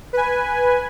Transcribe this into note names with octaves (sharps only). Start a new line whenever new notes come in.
B4 G#5